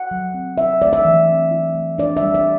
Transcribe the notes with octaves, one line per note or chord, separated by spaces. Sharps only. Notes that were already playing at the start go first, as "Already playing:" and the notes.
Already playing: F#5
F#3
C4
E4 E5
A3 D5
E5
E3
C4
E4
A3
D4 D5
E5
G3
D5